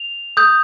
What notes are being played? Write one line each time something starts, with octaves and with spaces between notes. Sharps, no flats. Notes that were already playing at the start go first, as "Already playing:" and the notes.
Already playing: F7
D#6 G6